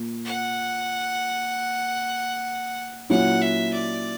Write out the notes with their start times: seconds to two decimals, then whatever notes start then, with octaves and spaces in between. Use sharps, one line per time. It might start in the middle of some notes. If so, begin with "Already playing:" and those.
Already playing: A#2
0.25 F#5
3.10 A#2 F#3 C#4 E4 F#5
3.42 E5
3.73 D5